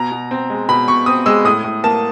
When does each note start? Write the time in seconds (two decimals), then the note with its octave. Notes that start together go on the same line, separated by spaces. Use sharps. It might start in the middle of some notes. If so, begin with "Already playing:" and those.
Already playing: B2 A#5
0.12 B2
0.31 C4
0.50 G#3
0.69 B2 B5
0.88 B2 C#6
1.06 C4 D#6
1.26 G#3 E6
1.44 A2 D#6
1.64 A2
1.84 A#3 A5